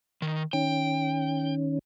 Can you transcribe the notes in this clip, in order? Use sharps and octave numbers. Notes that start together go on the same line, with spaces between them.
D#3
D#3 C#4 G5